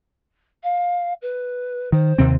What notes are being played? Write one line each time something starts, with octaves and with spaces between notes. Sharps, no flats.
F5
B4
D#3 C5
D#2 C3 C4